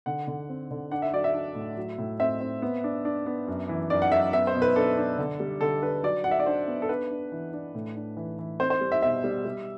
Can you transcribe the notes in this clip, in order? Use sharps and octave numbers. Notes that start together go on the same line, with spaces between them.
D3 F#5
D3
C4
D3
D4 F#5
E5
F#3 D5
E5
D4
A2
F#3
A2
C4 E5
C4
B3
D4
D4
B3
F#2
E3
F#2 D5
F#5
F#2 E5
B3 E5
C5
B2
B4
D4 A4
D4
D3
G3
D3 A4
D4 B4
F#3 D5
F#3 F#5
E5
D5
D4 C5
B3
A4
D4 B4
D4
E3
D4
A2
D4
E3
E3
C4 C5
C5
G3
E5
B2 E5
G3
G3